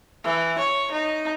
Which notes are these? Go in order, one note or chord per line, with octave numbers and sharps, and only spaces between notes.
E3
C#5
D#4